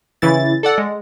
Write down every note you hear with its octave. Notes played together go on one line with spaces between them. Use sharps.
C#3 E3 E4 A6
A4 D5 F#5
G#3